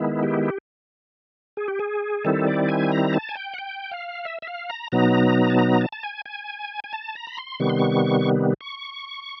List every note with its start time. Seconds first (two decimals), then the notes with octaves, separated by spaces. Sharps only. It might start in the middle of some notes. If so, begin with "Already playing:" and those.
Already playing: D#3 G#3 B3 E4
0.23 G4
1.57 G#4
1.68 G4
1.80 G#4
2.24 D#3 G3 C4 E4 A4
2.46 D5
2.69 G#5
2.91 A#5
3.13 A5
3.29 G#5
3.35 G5
3.54 F#5
3.58 G5
3.91 F5
4.25 E5
4.42 E5
4.47 F5
4.70 A#5
4.92 B2 F#3 B3 D#4 A#5
5.50 A5
5.59 A#5
5.81 A5
5.93 A5
6.03 G#5
6.26 G#5
6.84 G#5
6.93 A5
7.15 A#5
7.27 B5
7.38 C6
7.60 C3 D#3 G3 B3 C#6
7.70 C6
7.79 C#6
8.61 C#6